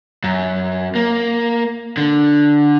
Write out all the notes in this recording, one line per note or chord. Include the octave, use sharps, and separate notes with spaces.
F#2
A#3
D3